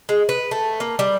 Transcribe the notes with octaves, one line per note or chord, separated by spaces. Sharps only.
G#3
B4
A3
A#3
G3